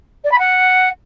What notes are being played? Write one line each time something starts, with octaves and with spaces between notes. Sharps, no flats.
D5
B5
F#5